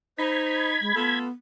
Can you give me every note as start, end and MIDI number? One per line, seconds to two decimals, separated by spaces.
0.19 0.77 63
0.19 0.69 72
0.19 1.19 83
0.19 1.19 92
0.81 0.92 56
0.96 1.26 57
0.96 1.30 59
0.96 1.26 65
0.96 1.26 69